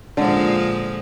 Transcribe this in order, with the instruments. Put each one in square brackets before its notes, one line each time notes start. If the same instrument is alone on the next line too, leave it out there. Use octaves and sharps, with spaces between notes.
[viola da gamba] A#2 F3 G#3 [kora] D3